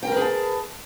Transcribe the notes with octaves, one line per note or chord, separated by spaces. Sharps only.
G#4 A#4 B4 G5 A5